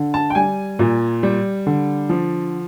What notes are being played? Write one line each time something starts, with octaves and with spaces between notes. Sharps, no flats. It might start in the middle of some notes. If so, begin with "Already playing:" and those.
Already playing: D3
A5
G5
G3 G#5
A#2
G3
D3
F3